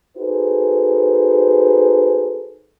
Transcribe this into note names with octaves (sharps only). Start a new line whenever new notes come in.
D#4 F#4 G#4 A4 B4 C5